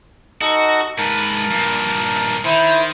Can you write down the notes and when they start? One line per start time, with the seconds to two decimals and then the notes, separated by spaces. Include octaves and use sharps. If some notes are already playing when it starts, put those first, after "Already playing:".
0.41 D#4 F#4 A4 D#5
0.98 G#2 A#4 B4 A5
1.51 G2 A#2
2.45 D#3 E4 C5